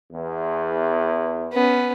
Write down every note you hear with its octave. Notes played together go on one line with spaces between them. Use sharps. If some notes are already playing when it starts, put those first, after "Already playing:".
E2
B3 C#4